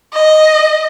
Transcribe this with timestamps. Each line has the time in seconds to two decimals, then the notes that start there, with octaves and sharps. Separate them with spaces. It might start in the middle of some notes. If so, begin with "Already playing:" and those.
0.13 D#5